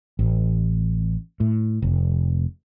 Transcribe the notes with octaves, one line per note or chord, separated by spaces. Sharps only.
A1
A2
F1